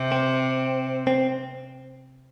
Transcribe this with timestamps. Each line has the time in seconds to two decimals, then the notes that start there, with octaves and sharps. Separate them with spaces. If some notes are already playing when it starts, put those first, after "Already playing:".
Already playing: C3
0.12 C4
1.07 C4